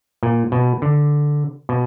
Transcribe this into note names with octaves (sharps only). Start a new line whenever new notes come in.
A#2
B2
D3
B2